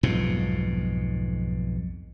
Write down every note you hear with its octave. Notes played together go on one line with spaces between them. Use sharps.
B1 F2 G#2 B2